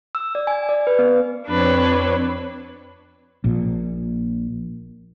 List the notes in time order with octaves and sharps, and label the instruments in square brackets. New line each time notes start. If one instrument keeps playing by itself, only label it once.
[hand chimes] E6
D5
G#5
D5
B4
B3
[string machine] F2 C4 C#5 [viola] D4 B4
[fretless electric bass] A#1 A#2